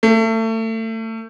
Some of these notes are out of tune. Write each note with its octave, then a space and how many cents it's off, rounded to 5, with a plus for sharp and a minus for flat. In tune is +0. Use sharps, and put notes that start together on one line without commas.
A3 +30